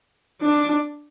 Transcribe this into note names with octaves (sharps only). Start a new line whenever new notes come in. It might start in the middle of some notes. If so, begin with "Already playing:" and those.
D4